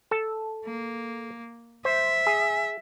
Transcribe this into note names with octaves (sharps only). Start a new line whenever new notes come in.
A4 A5
A#3
C5 E5
G#4